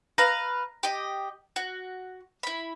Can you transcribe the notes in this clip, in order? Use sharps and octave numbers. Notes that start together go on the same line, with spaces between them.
B4 F5 A#5
G4 D#5
F#4
E4 B5